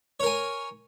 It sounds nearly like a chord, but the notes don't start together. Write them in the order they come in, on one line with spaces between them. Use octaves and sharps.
C#5 A#4 G#5